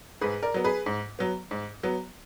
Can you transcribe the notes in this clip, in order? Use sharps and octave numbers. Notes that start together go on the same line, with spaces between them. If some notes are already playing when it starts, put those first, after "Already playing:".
G#2 G#4 B4
A#4 D5
F#3 B3
G#4 B4
G#2
F#3 B3
G#2
F#3 B3